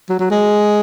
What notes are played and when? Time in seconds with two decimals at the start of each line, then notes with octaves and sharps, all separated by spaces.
0.09 F#3
0.19 F#3
0.30 G#3